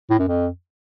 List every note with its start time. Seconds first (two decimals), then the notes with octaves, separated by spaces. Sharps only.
0.10 A2
0.19 F#2
0.28 F2